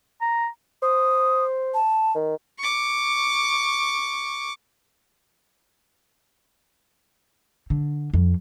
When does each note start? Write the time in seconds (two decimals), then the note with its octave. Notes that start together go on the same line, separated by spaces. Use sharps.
0.21 A#5
0.82 C5 D#6
1.74 A5
2.15 D#3
2.59 C#6 D6
7.70 D3
8.14 F2